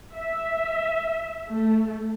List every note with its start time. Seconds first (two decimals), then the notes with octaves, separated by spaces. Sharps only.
0.13 E5
1.50 A3